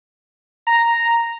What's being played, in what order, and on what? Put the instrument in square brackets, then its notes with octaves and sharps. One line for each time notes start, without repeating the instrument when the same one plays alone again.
[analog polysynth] A#5